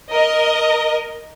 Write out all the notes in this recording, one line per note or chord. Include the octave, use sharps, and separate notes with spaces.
A#4 D#5